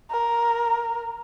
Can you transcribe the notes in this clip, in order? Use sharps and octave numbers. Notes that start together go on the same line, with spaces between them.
A#4